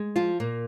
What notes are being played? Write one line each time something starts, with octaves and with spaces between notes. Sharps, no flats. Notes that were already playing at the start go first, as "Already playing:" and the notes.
Already playing: G#3
F3 F4
A#2 A#3